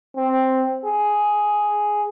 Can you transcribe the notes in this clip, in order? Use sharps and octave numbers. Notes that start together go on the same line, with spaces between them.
C4
G#4